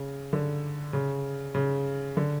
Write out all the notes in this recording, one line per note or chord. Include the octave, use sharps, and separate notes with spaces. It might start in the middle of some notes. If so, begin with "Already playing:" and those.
Already playing: C#3
D3
C#3
C#3
D3